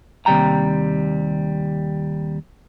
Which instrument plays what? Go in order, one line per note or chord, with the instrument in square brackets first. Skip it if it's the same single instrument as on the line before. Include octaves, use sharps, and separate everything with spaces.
[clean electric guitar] D#2 C3 G3 G5 A#5